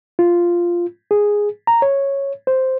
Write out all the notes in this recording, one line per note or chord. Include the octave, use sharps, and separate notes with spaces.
F4
G#4
A#5
C#5
C5